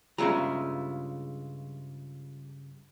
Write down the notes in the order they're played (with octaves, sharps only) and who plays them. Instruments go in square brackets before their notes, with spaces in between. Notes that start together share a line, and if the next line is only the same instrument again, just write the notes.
[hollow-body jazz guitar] G2 C#3 A#5 [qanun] G#3 F4 E5